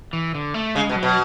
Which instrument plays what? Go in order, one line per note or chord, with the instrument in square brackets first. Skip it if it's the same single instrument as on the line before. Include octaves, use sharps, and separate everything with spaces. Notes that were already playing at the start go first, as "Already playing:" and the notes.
[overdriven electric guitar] E3
D3
A3
[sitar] C#3 [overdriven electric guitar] G#3
[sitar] B2 [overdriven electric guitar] G#3
[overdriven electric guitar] F#3
[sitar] B2